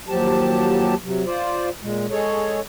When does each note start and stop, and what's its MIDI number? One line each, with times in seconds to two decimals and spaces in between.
0.08 0.95 39
0.08 0.95 53
0.08 0.95 54
0.08 0.95 67
0.08 0.95 81
1.04 1.24 48
1.04 1.24 54
1.26 1.69 65
1.26 1.69 72
1.26 1.69 74
1.82 2.07 46
1.82 2.07 56
2.11 2.60 56
2.11 2.60 68
2.11 2.60 69
2.11 2.60 73